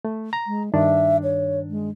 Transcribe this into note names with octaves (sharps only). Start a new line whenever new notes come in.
A3
A#5
G#3
G2 D#3 D4 E5
C#5
G#3